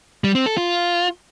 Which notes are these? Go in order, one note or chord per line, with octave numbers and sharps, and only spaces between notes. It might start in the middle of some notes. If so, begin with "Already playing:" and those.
G3
C4
A4
F4